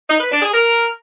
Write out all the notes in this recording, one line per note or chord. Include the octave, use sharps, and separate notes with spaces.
D#4
B4
D4
G#4
A#4